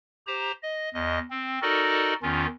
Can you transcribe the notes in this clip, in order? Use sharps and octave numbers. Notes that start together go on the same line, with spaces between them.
G4 C5 A#5
D#5
E2 D#5
C4
D#4 F#4 A4 A#4 D5 D#5
E2 D#3 C#4 F4